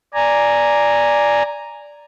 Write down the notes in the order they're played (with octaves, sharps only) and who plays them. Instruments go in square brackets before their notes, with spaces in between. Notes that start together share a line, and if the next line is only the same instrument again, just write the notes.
[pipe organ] D5 G#5 A#5